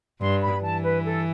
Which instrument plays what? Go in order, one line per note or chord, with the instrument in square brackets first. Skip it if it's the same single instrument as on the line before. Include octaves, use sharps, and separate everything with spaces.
[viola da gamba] G2 [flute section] C6
[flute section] B5
[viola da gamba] E3 [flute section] A5
[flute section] B4
A4